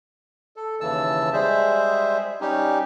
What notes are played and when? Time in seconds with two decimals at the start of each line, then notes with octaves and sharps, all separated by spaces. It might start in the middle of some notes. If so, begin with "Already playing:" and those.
0.56 A4
0.81 D#2 C#3 E3 A5 E6
1.33 G3 G#3 G#4 C5 E5
2.41 G3 C#4 D#4 G4